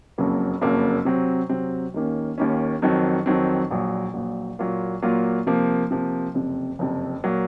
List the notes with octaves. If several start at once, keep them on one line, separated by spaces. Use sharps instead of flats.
F#1 F2 C#3 F#3 A#3
F#1 F2 C#3 F#3 A#3
C3 F#3 C4
C3 F#3 C4
D#2 D#3 A#3 C#4
D#2 D#3 A#3 C#4
F2 D#3 F#3 C4
F2 D#3 F#3 C4
A#1 A#2 F#3
A#1 A#2 F#3
A#2 F#3 A#3 F4
A#2 F#3 A#3 F4
C3 F3 A#3
C3 F3 A#3
F#1 F2 C3
F#1 F2 C3
A#2 F#3 A#3